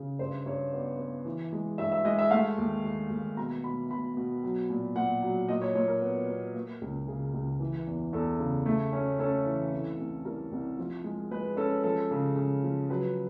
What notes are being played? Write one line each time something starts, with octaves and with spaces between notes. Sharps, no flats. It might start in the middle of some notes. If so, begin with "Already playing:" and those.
Already playing: C#3
G2 C5
G2 C#5
B3 D5
B3
E3
G#3
G2 E5
E5
G#3 D#5
E5
A3 F5
D#2
D#2
D#2
B2 A#5
B2 B5
B2 B5
B2
F#3
A#2
A#2 F#5
F#3
A#2 D#5
C#5
A#2 C#5
A#4
B3
B3
A#3
C#2
C#3 G#4
C#2
E3
E2
E2 A4
C#3
A3
C#4
C#4 A4
E3
C2
C2
G3 A#4
C2
F3
G#3
G#3 B4
C#4 A4
F3 A4
C#3
C#3
F3
F#3 B4